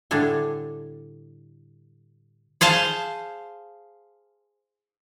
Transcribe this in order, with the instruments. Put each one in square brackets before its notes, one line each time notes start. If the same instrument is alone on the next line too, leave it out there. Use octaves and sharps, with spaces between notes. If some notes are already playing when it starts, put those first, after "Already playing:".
[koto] A2 D3 G3 D4 A4 G#5
G#4 C5 F5 A5